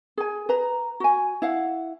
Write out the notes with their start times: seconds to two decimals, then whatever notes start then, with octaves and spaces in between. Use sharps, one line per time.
0.17 G#4 G#5
0.49 B4 A#5
1.00 F#4 G#5
1.42 E4 F5 F#5